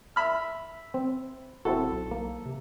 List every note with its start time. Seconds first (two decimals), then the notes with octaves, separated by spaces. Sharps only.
0.16 E5 B5 F6
0.94 C4
1.65 D#1 C4 E4 F#4 A4
1.91 B1
2.11 A#3
2.46 C3